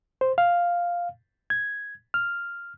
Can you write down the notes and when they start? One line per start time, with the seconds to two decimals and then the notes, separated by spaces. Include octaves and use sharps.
0.21 C5
0.38 F5
1.50 G#6
2.14 F6